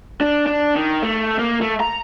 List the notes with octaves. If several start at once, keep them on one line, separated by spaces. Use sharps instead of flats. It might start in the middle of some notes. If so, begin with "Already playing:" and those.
D4
D4
D#3
A3
A#3
A3
A#5